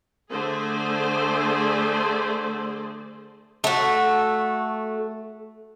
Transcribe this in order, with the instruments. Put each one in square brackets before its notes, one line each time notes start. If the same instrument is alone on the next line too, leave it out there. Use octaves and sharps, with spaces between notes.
[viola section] D3 A3 G#4 C5 D5
[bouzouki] A3 F#4